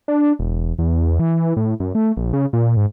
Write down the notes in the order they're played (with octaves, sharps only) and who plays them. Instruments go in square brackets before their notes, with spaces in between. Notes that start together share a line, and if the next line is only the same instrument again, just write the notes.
[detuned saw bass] D4
E1
E2
E3
A2
F#2
A3
A#1
C#3
A#2
G#2